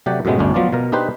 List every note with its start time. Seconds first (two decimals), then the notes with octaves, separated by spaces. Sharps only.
0.06 C3 F#3 A3 G4 D5 F#5
0.25 F#2 A2 C3 F#3 G#3 B3
0.39 G1 D2 A2 C#4 D4
0.54 F3 F#3 B3 F4 D5
0.73 B2 A#4
0.92 D4 D#4 G4 B4 C5